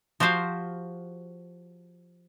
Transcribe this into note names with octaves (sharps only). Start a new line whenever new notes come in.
F3 F#4 G4 C5 F5